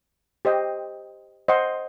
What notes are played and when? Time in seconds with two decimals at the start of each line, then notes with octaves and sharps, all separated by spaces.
0.45 G4 C5 D#5 G5
1.48 C5 D#5 F#5 C6